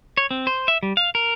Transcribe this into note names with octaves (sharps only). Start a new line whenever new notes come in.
C#5
C4
C5
E5
G3
F5
A#4